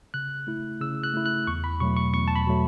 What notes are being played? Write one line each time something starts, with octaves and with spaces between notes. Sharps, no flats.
C#3 F#6
A3 E4
C#3 E6
F#6
A3 E4
F#6
E2 C#6
B5
B2 F#3 A3 C#6
C#6
E2 C#6
A5
B5
B2 F#3 A3